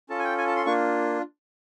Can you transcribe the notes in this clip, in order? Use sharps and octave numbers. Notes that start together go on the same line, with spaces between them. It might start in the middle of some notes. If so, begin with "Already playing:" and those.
C#4 F4 A4 A5
G#5
G5
G#5
A5
C6
A#3 D4 F4 C#6